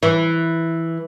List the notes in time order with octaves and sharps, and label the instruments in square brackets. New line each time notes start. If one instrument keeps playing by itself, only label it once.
[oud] E3